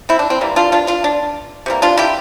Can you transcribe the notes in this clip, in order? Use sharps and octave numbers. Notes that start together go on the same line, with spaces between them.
C4 E4
D4
C4
C3 E3 G3 A#3
D4 F4
D4 F4
D4 F4
D4
C3 E3 G3 A#3
D4 F4
E4 G4